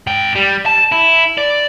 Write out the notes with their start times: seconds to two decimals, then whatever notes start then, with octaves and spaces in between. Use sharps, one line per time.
0.07 G#2 G5
0.35 G3
0.66 A5
0.92 E4
1.38 D5